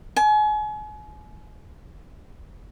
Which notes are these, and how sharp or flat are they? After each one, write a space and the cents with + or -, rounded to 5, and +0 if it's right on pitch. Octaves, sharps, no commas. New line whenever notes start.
G#5 +35